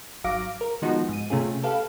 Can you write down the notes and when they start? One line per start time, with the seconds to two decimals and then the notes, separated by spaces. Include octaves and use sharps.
0.24 G#1 F#3 F5 D6 A#6 D7
0.61 A#4
0.82 D#3 F3 G#3 B3 D#4 F#4
1.09 G#2 D#7
1.30 C3 A3 C#4 F4 G#4
1.63 G4 A4 B4 F5